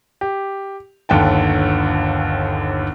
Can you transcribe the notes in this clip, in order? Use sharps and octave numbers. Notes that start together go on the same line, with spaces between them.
G4
G1 D#2 D3 G5 A5